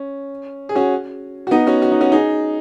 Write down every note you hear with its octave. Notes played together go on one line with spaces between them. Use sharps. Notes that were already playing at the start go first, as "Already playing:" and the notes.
Already playing: C#4
G#4
C#4 F#4
F#4
B3 D#4
C#4 F#4
F#4
D#4
C#4 F#4
D#4 G#4